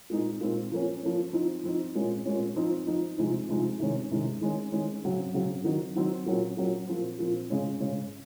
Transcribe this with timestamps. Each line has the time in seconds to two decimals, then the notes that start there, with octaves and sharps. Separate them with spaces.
0.10 A#2 G#3 C4 D#4
0.41 A#2 G#3 C4 D#4
0.72 F3 A#3 C#4
1.03 F3 A#3 C#4
1.33 F3 C4 D#4
1.64 F3 C4 D#4
1.95 A#2 G#3 C#4
2.25 A#2 G#3 C#4
2.56 F3 C4 D#4
2.87 F3 C4 D#4
3.18 C3 F3 G#3 C4 D#4
3.49 C3 F3 G#3 C4 D#4
3.79 C3 D#3 G#3 C#4
4.11 C3 D#3 G#3 C#4
4.41 D#3 G#3 C#4
4.72 D#3 G#3 C#4
5.04 C#3 F#3 C4
5.34 C#3 F#3 C4
5.64 D#3 F#3 C4 D#4
5.96 D#3 F#3 C4 D#4
6.26 A#2 F#3 C#4
6.57 A#2 F#3 C#4
6.87 A#2 F3 C4
7.19 A#2 F3 C4
7.50 C#3 G#3 C#4
7.80 C#3 G#3 C#4